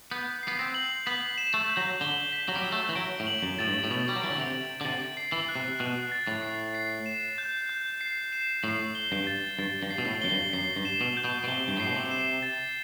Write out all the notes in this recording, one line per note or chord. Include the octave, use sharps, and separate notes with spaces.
B3 G6
B3 C7
C4
F#7
B3 B6
E7
A3
G6
F#3
D3 G7
B6
F#3
G3
F#3 E7
A3
E3
F#3 D7
A2
F#7
F#2
A2 A6
G2
A2
B2 A6
G3
F#3
E3 D7
D3
C3
F#7
D3
C3 A6
C7
E3
F#6
C3
B2 F#6
A6
A2
C7
C7
E7
G6
G6
C7
E7
A2 C7
G7
G2
A6
G2 A6
G2
C7
B2
A2
F#2 G7
G2
F#2 C7
G2
E7
B2
G6
B2
B2
C3 G7
G2
A2 C7
B2
C3
E7
A6